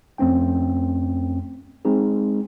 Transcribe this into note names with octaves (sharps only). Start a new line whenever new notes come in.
F2 A3 C4 C#4 G5
G#3 C4 D#4 G#4